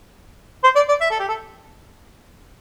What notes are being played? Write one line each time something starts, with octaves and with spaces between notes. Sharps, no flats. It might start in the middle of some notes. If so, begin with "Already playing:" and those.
C5
D5
D5
E5
A4
G4
A4